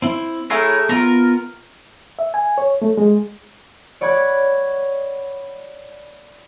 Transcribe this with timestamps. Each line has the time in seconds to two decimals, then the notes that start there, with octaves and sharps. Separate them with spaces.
0.02 C4 E4
0.50 A3 E4 G#4 A#4 C#5 A#5
0.89 B3 F4 A#4
2.19 E5
2.34 G#5
2.58 C#5
2.82 A3
2.97 G#3
4.01 C#5 D5 F#5 B5 G#6